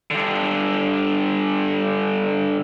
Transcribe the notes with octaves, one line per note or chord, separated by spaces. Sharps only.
G2 D3